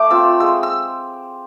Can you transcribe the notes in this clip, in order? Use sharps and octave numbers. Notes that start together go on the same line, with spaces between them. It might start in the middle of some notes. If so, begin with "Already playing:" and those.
Already playing: A3 A5 D6
C4 F4 E6
G#3 E6
E6